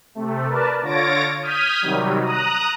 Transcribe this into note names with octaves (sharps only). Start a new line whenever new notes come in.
C3 A3
A#4 B4 D5 A5
D3 F4 C#5 A6 A#6 D7
D#6 F6 G6 G#6 B6 D#7
C3 D#3 F#3 G3
A#5 D#6 F#6